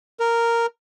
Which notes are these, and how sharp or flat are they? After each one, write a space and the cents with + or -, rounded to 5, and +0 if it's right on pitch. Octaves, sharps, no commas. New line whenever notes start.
A#4 -5